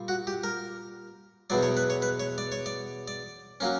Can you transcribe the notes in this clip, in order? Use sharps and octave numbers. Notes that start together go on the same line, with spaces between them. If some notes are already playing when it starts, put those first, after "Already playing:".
Already playing: A#2 G3
F#4
G4
A#4
E2 B2 F#3 D5
C#5
B4
C#5
B4
C#5
D5
C#5
D5
D5
F#3 A#3 C#4